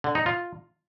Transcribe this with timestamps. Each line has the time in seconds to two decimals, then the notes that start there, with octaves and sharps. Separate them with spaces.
0.04 D3
0.15 D#4
0.26 F4